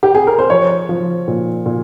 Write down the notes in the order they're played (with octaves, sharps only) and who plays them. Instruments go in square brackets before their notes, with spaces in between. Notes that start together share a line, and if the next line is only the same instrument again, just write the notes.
[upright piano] G4
G#4
A#4
C5
F3 C#5
F3
A#2
A#2